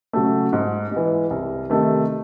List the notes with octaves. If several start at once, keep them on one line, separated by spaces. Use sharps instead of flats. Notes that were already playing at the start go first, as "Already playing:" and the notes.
C#3 F#3 A3
G#2
E3 G#3
C2
C3 D#3 A3